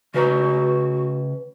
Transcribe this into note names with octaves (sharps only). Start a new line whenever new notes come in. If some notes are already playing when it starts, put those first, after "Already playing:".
C#3 F#4 B4 A#5